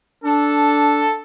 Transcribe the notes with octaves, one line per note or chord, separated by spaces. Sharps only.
D4 A4